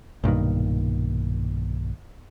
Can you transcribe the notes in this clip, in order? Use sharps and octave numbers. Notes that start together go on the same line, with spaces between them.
B1 G2 A#2 D#3